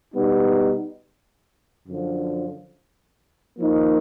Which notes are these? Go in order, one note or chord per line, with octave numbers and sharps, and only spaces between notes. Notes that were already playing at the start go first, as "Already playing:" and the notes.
B2 G3 B3 D#4
F#2 D3 F3
F3 A#3 D#4